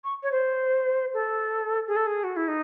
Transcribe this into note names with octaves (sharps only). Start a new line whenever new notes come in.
C#6
C#5
C5
A4
G#4
A4
G#4
F#4
E4
D#4